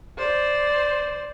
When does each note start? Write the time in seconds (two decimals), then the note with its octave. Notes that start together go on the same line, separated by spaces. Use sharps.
0.18 C5 D5